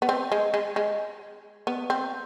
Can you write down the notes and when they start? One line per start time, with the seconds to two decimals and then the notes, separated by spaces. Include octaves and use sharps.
0.02 B3
0.09 C4
0.32 G#3
0.54 G#3
0.76 G#3
1.67 B3
1.90 C4